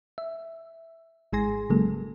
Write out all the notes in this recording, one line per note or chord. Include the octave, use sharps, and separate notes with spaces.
E5
G#1 G#3 G#4 G#5 C6 A#6
G#1 C#3 F#3 G#3 A#3 A4